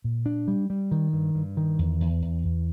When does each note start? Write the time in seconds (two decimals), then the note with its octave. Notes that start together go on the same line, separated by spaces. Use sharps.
0.04 A#2
0.26 D4
0.48 G3
0.70 G3
0.91 D#3
1.13 G2
1.35 G2
1.57 D#3
1.79 E2
2.00 E2
2.22 E2
2.44 E2